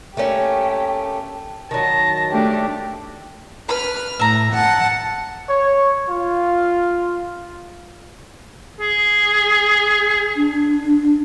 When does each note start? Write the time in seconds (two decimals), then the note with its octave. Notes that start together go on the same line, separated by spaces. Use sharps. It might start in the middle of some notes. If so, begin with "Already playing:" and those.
0.17 A3 A#3 C#4 G4
1.71 D#3 F#3 A5 A#6
2.32 A3 D4 G4
3.69 B4 B5 F6
4.20 A2 E5 A#5
4.53 F#5 A5
5.50 C#5
6.10 F4
8.80 G#4
10.36 D4